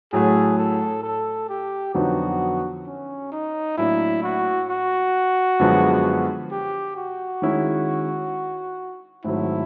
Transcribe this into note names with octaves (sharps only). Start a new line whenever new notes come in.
A2 F#3 A3 G#4
A4
A4
G4
F2 D3 F#3 B3 D#4 F#4
C#4
D#4
A2 F#3 A#3 D4 E4
F#4
F#4
F#2 D3 F3 G#3 B3
G4
F#4
D#3 G#3 C#4 E4
G#2 D#3 F#3 A3 C4 E4